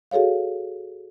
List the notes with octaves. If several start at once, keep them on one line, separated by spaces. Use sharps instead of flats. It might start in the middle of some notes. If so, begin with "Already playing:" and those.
F#4 G#4 A4 C#5 F5